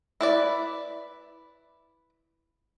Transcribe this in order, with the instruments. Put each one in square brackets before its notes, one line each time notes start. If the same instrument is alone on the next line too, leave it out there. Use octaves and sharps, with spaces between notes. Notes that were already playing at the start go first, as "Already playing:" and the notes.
[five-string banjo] E4 B4 D5